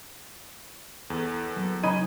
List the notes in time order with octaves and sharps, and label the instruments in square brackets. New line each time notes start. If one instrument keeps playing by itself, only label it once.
[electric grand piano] E2 [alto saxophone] A4
[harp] F#3 A#3 B3
[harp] C#3 [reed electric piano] C#4 D#4 [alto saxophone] D#5 [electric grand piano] B5 G#6 D#7